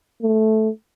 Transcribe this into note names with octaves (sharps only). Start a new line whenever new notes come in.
A3